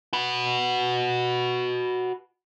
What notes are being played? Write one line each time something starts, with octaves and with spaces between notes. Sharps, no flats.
F#4 B4